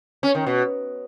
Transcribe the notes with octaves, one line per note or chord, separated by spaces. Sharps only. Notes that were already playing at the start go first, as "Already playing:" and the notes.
C#4
D#3
B2